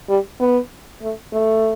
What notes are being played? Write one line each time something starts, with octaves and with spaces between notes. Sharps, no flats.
G3
B3
A3
A3